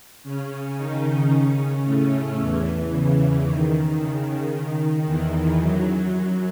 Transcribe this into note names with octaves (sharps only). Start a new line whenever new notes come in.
C#3 C#4
D#3 D#4
C#3 C#4
A2 A3
E2 E3
C#3
D#3
C#3
D#3
E2 E3
F#2 F#3